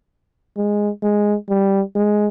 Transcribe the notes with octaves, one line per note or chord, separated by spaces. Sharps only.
G#3
G#3
G3
G#3